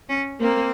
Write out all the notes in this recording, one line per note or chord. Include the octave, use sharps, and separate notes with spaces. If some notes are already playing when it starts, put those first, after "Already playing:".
C#4
A#3 C4